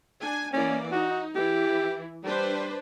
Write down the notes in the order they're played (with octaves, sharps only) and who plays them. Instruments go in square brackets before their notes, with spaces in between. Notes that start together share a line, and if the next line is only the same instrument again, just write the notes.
[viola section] D4 G#5
[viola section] E3 A#3 D5 [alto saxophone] C#4
[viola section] D#4 [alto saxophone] F#4
[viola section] E3 E4 [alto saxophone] G4
[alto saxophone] G3 [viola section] D4 B4 C5